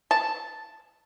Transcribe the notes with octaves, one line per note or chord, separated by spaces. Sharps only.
A5